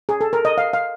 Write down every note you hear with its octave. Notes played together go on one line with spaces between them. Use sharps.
G#4
A4
A#4
D#5
F5
F5